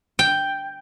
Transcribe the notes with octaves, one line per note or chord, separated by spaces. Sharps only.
G5